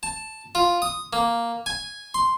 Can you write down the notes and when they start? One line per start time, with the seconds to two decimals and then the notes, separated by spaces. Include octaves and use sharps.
0.03 A5
0.55 F4
0.82 D#6
1.13 A#3
1.66 G#5
2.14 C6